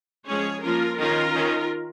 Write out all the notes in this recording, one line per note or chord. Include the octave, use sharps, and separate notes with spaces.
F3 G#3 C#4 G#4 C#5
F3 A#3 C#4 F4 A#4
D#3 C#4 F4 A#4
D#3 C#4